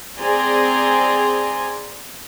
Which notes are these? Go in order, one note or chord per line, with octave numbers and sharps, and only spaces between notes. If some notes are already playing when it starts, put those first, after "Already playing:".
C4 G#4 D5 G#5 A#5 C6